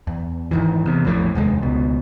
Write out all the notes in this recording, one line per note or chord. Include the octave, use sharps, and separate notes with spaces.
E2
G#1 D#3 E3
E2 C3
A#1 F2 A2
F1 D#2 G#3
C#2 B2